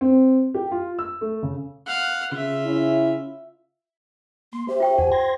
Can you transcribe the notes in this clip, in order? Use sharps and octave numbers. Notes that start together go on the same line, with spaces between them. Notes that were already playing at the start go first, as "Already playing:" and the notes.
C4
G4
F4
E6
A3
C#3
F5 F#5
C#3 F4 E5
C#4 E4
A#3 C6
G4 C5 E5
F4 G5 C#6
E2 G4 F#5 G#5
C6 G#6 A#6